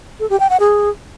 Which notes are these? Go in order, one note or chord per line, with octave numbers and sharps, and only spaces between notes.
A4
G4
G5
F#5
G#4